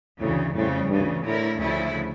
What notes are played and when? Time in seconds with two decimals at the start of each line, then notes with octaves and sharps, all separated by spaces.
0.21 D2 A2 C#3 E3
0.55 F2 A2 C#3 G3
0.89 D2 G2 C#3 E3
1.24 A2 D3 A3 E4 A#4
1.60 D2 C#3 F3 A3 E4